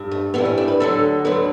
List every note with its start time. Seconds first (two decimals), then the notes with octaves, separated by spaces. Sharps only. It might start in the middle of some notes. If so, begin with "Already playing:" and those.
Already playing: G2
0.11 A3
0.34 G2 E3 G3 B3
0.45 C#4
0.58 D4
0.68 B4
0.80 D2 D3 F#3 A4
1.25 D2 D3 F#3 B4